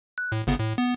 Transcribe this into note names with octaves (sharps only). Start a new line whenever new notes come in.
F#6
A2
G1 C#3 B3
A2
B3